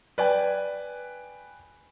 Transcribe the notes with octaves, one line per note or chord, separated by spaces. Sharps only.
B4 D5 G5 G#5